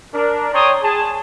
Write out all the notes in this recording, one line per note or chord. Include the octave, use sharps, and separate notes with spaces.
D4 A#4
C#5 D5 G5 A#5 C6 D#6
G#4 A5